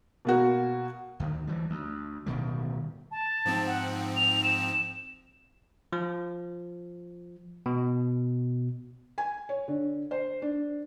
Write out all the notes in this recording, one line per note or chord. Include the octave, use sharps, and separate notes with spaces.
B2 A#3 F#4
D2 D#3
E3 G3
D2
D1 B2 D#3 G3
A5
G#2 F3 C4
F#5
F7
E7
F3
B2
G#5
C#5
D3
C5
D4